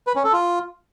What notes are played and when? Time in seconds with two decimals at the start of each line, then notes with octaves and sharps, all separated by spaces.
0.07 B4
0.16 C#4
0.24 A4
0.33 F4